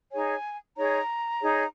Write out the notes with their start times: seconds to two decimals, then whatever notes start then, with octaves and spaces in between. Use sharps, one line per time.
0.11 D#4 G#4 C#5 G#5
0.76 D#4 G#4 C#5 A#5
1.41 D#4 G#4 C#5